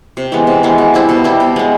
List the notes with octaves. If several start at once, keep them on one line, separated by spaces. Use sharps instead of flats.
C3
E3 G#3 B3
C3
E3 G#3 B3
B2
G3 C4 E4
B2
G3 C4 E4
B2
G#3 B3